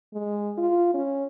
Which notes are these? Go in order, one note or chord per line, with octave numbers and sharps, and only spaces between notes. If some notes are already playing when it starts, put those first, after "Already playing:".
G#3
F4
C#4